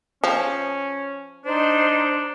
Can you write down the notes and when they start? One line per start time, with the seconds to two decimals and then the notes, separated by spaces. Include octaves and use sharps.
0.24 F3 C#4
1.46 D4 D#4 C5